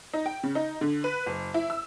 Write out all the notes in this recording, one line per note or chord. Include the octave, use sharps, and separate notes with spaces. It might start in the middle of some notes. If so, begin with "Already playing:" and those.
D#4
G5
C#3
D#4
D3
B4
F#1
E4
E6